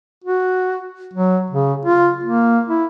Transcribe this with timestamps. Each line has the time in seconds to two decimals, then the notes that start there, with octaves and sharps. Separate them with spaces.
0.24 F#4
1.13 F#3
1.50 C#3
1.85 F4
2.23 A#3
2.68 E4